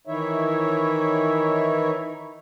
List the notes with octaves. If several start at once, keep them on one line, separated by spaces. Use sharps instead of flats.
D#3 E3 D#4 E4 C#5 E5